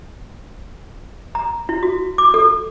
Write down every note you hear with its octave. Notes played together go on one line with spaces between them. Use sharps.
A#5
E4
F#4
D6
A4